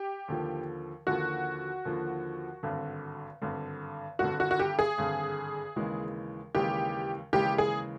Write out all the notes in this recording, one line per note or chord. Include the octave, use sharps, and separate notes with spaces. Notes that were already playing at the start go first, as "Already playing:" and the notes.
Already playing: G4
D#2 D3 F3
D#2 D3 F3 F#4
D#2 D3 F3
G#1 G2 D3
G#1 G2 D3
G#1 G2 D3 F#4
F#4
F#4
G4
G#4
G#1 G2 D3
D#2 C#3 E3 G#3
D#2 C#3 E3 G#3 G4
D#2 C#3 E3 G#3 G4
G#4